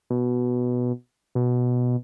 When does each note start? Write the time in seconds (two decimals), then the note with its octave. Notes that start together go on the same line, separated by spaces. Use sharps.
0.10 B2
1.35 B2